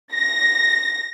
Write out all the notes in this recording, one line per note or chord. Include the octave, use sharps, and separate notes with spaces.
A#6